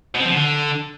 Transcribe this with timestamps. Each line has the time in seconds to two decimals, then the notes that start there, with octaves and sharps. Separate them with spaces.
0.15 B2
0.20 C4
0.25 F3
0.31 B2
0.36 D3